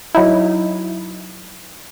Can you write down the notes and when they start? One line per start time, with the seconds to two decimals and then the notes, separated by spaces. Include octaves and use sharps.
0.15 F#3 D#4 E4